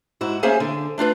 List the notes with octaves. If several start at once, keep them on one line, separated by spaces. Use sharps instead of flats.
G#2 E4 F#4
A#3 C#4 G#4 C5 E5 G#5
D3
A3 D4 F4 B4